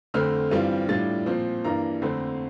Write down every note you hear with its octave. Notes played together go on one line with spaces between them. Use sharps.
F2 D3 A3 C4 F6
G2 E3 G3 C4 F4
A2 G3 D4 F4 A6
A#2 F3 C4
G2 E3 A#3 D4 A#5
F2 D3 A3 C4